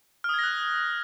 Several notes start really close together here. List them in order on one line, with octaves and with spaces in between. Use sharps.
F6 D#6 G#6 A#6 F#6